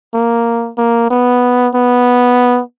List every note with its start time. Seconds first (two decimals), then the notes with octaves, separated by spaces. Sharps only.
0.14 A#3
0.78 A#3
1.11 B3
1.75 B3